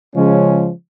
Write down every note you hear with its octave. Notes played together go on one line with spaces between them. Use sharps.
C#3 F3 G#3 C#4